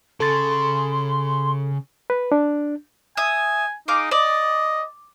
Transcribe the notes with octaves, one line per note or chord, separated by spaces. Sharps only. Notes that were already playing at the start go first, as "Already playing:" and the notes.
C#3 A4 C6 A6
B4
D4
E5 G#5 D#6
D#4 G#4 F5 D6
D5 D#5